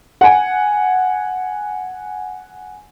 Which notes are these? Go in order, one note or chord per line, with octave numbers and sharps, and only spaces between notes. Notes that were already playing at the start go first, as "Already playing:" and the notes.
F#5 G#5